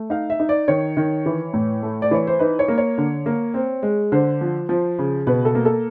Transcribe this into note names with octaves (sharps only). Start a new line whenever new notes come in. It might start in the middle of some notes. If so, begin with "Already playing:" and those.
Already playing: A3
D#4 F5
E5
D#4
D5
D#3 C#5
D#3
E3
A2
A3
D5
E3 C#5
C5
D#4 B4
C#5
A#3
C#5
D3
A#3
C4
G#3
D3 C5
F3
F3
C#3
B2 B4
A4
A#3
A4